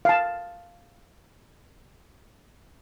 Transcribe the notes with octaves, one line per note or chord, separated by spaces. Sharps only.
F5 A5